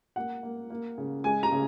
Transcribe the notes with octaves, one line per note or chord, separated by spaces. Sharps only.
A#3 F#5
A#3
A#3
C#3
G#3 G#5
A#5
C#3